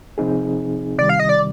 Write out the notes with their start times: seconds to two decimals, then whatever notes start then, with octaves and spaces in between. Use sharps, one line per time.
0.18 C3 F3 C4 D#4 G#4
0.98 C3 D#3 G3 D5
1.09 F5
1.19 D#5
1.29 D5